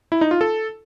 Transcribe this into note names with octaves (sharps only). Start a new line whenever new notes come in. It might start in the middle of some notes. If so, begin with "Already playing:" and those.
E4
D#4
F4
A4